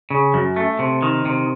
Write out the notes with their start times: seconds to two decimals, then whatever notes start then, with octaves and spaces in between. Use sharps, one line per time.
0.10 C#3
0.34 F#2
0.56 A3
0.79 C3
1.02 D#3
1.25 C3